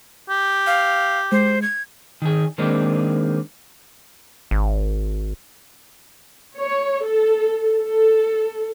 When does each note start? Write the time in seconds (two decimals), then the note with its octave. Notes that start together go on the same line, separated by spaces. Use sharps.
0.29 G4
0.67 F5
1.32 G#3 C5
1.62 G#6
2.22 D#3 G#4
2.58 D#3 G#3 A#3 C4 D4 D#4
4.51 G#1
6.59 C#5
7.05 A4
7.79 A4